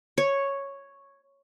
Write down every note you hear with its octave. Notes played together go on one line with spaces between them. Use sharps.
C#5